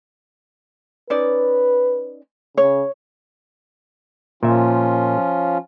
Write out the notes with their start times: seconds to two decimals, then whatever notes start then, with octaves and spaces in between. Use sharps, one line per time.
1.10 C#4 D#4 B4 D5
2.57 C#3 C#5
4.43 A#2 F3 C#4 F4 E5